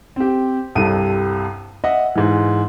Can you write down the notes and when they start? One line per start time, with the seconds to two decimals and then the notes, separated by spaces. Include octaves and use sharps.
0.16 C4 G4
0.75 C2 G2 C3 A4 D#7
1.84 D#5 E5 F#5
2.15 G#2 E3